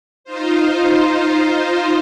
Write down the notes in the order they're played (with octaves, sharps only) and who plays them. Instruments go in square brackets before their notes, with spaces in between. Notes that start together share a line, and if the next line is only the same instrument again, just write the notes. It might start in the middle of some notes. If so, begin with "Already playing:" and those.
[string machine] D#4 F4 C5